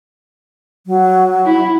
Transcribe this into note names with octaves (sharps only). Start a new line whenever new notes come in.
F#3
E4